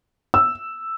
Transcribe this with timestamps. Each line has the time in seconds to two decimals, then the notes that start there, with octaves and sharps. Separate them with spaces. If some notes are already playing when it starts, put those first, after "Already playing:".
0.34 E6